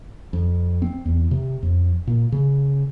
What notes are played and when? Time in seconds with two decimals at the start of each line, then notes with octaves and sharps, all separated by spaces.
0.33 F2
0.82 C4
1.05 E2
1.31 C3
1.63 F2
2.07 A#2
2.32 C#3